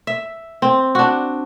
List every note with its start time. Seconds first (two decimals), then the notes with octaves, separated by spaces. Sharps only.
0.07 E5
0.62 C4
0.95 D4 F#4